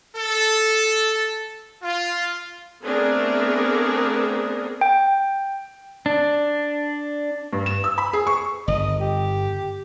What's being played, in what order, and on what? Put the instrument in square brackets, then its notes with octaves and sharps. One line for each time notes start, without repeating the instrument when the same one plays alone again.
[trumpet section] A4
F4
[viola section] A3 B3 C4 D4 G#4 A#4
[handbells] G5
[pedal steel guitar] D4
[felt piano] G2
E7
E6
B5
G#4
C#6
[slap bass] G1 [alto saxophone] D#5
[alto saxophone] G4